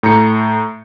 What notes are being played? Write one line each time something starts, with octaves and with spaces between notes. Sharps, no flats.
A2 A#5 G6 C#7